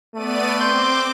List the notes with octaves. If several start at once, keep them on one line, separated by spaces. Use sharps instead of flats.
A3 B3 D5 D#7
C4 C6 D6 G6